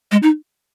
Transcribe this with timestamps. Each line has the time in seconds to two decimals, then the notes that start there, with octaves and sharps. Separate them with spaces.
0.12 G#3
0.23 D#4